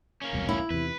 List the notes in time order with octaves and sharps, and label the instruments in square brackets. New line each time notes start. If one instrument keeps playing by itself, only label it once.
[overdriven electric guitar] A#3 C#4
[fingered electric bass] E1 C2 B2
[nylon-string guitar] E4
[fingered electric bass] E2 C3 [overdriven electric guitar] B4